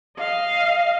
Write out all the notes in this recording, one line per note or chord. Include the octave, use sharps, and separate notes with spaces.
D#5 F5